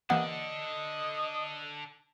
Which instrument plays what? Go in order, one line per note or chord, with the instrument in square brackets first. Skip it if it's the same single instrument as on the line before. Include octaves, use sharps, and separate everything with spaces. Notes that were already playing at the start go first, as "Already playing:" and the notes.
[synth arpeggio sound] E3 A#3 G4 [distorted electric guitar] D4 A4 [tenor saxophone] D#5 [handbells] F#5